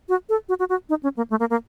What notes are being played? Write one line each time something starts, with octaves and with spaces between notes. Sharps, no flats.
F#4
A4
F#4
F#4
F#4
D#4
C#4
A#3
A3
A#3
A#3